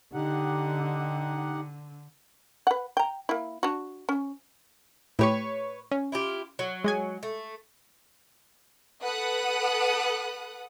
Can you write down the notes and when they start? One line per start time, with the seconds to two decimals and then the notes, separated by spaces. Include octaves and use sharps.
0.14 D3 D#4 G4 F#5
2.67 B4 F#5
2.97 G5 A#5
3.29 A#3 E4
3.63 D4 F#4
4.09 C#4
5.19 A2 G4 B4 C#5 C#6
5.91 C#4
6.12 E4 F4 G4
6.59 F#3
6.84 G#3 D#5 G#5
7.23 A3
9.01 A4 B4 F#5 D#6 F#6